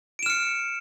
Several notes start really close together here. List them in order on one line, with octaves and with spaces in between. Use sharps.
D7 E7 F6 C#7